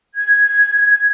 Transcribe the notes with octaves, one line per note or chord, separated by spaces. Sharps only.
G#6